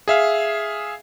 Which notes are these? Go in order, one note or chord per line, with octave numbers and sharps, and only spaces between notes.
G#4 E5 F5